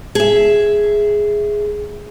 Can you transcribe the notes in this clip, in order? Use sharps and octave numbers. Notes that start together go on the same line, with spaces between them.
G#4 E5